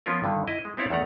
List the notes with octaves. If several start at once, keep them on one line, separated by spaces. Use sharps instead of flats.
F3 B3 C#4 F4 A#4
G2 D3 D#3
E4 D#5
G#3
B3 C4 E4 C#5 D5 F5
E2 D#3 A3 F#5 A#5